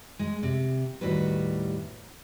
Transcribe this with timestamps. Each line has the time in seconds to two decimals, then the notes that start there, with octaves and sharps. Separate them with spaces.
0.19 G#3
0.43 C3
1.01 D#2 A2 G3 F#4 B4